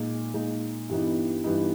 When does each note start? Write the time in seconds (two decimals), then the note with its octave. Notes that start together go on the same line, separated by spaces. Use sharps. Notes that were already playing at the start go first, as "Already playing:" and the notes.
Already playing: A#2 G#3 D#4
0.34 A#2 G#3 D#4
0.89 G2 E3 G3 B3 D#4
1.44 G2 E3 G3 B3 D#4